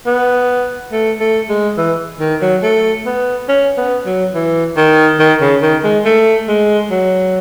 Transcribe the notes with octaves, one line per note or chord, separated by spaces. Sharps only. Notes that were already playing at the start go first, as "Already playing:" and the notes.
B3
A3
A3
G#3
E3
D#3
F#3
A3
B3
C#4
B3
F#3
E3
D#3
D#3
C#3
D#3
G#3
A3
G#3
F#3